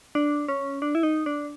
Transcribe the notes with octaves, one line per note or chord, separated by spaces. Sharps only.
D4
C#4
D4
E4
D#4
D4